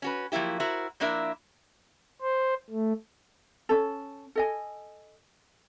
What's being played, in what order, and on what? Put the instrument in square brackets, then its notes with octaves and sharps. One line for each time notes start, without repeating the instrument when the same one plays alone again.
[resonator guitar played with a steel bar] C#4 F#4 B4
F3 F#3 A#3 E4 G4
E4 F#4 A#4 C5
F3 A#3 D4 E4 A#4 E5
[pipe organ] C5
A3
[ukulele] C#4 A4
A4 D#5 G#5